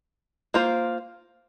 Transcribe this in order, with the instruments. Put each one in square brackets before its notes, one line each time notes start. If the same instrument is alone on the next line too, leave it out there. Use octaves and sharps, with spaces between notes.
[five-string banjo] A#3 F4 C5